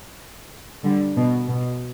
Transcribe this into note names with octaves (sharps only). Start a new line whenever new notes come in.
D3 G3
B2
B2